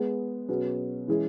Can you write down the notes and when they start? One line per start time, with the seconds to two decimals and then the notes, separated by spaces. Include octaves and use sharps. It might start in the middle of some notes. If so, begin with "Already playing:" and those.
Already playing: G#3 B3 G#4 B4
0.49 B2 F#3 C#4 G#4 B4
1.08 E3 G#3 C#4 E4 G#4